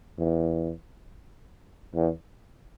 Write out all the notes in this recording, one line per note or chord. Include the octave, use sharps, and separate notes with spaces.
E2
E2